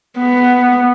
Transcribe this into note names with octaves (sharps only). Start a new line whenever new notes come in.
B3